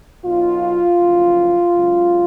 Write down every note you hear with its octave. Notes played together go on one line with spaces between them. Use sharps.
B1 B2 F#3 F4
F#1 F#2 F3
C#2 C#3 F#3